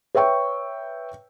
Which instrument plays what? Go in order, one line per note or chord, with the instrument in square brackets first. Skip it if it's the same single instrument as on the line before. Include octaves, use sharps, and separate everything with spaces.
[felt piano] B4 C#5 E5 G5 C#6